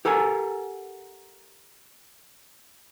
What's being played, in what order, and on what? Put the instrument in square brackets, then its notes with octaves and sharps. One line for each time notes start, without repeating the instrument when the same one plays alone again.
[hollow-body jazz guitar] G4 A4 A#4 F#5 G#5